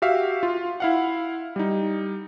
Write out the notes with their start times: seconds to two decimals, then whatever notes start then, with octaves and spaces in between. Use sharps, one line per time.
0.02 F#4 G4 E5 F5
0.43 F4
0.80 E4 F5 F#5
1.56 G3 D#4